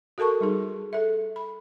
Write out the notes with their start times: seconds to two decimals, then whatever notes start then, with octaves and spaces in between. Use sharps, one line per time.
0.18 F#4 A4 A#4 A5 C#6
0.41 G3 D#4 G#4
0.93 A4 E5
1.36 B5